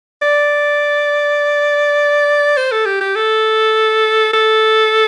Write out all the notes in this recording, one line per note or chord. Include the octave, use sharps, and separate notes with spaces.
D5
C5
A4
G4
G4
A4
A4